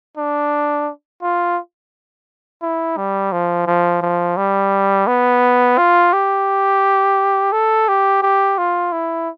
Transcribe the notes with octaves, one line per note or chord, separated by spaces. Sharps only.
D4
F4
E4
G3
F3
F3
F3
G3
B3
F4
G4
A4
G4
G4
F4
E4